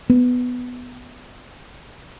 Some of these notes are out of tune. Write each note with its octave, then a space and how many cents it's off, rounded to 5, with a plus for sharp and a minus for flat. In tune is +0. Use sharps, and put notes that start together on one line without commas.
B3 +5